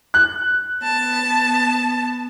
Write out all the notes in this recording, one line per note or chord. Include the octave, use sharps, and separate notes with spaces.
F#6
B3 A5